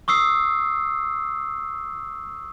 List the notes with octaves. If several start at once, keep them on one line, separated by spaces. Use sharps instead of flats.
C#6 D#6 E6 C7